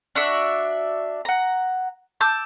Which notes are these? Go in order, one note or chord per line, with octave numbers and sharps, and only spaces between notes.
D4 F#4 D5 E5
F#5 A#5
A5 D6 E6 G6